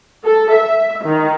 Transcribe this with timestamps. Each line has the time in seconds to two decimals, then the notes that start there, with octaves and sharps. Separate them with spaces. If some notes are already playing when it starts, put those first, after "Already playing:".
0.25 A4
0.54 E5
1.06 D#3